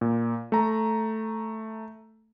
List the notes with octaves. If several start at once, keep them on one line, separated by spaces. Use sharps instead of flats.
A#2
A3 A#5